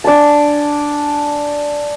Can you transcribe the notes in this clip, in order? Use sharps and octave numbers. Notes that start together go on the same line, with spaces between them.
D4 D5 G#5 A5